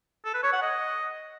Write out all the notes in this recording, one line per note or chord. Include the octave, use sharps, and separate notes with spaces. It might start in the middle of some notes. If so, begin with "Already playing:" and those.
A4
B4
C#5
F#5
D#5